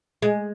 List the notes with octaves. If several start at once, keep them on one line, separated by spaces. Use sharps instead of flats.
G#3